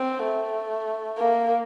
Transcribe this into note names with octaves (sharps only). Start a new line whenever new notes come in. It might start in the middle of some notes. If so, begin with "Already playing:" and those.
Already playing: C4
A3
A#3